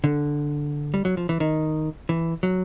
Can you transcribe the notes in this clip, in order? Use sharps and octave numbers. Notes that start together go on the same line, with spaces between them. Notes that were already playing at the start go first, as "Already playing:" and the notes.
D3
G3
F#3
F3
E3
D#3
E3
F#3